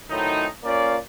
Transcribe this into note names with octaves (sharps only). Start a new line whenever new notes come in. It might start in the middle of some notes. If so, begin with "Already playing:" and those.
A2 D#3 F#3 A3 C4 D#4
A#3 C#4 F4 C5 D5